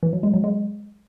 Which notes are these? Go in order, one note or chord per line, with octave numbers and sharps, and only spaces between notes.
E3
F#3
G#3
F#3
G#3